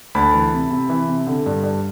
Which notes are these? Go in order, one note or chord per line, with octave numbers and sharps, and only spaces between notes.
D2 A5 B5
E3
C3
C3
E3
C3
D3
G2
G2